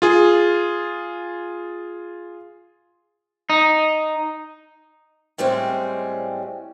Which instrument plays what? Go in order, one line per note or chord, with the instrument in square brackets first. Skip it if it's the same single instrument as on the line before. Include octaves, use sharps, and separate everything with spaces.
[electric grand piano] F4 G#4
[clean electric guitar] D#4
[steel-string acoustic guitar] A2 G3 G#3 C4 C#4